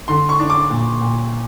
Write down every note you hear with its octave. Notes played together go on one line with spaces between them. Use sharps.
D3 C6
C#6
D4
D6
A#2
A#2